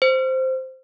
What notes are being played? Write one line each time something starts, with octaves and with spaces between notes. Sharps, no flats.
C5